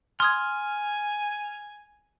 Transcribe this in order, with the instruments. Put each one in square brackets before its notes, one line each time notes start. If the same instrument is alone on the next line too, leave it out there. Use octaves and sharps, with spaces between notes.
[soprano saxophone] G#5 [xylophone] C6 D#6 G#6 [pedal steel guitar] F6